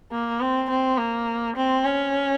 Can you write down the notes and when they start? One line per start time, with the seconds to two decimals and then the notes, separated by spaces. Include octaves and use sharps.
0.12 A#3
0.41 C4
0.70 C4
0.98 A#3
1.56 C4
1.85 C#4